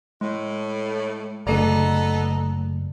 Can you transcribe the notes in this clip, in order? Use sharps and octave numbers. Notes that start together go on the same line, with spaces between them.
A2 G#3
F#1 D3 A3 B3 A4 D5 D#5 A#5